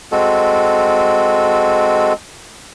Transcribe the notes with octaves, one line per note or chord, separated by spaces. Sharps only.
G#3 C4 F#4 A4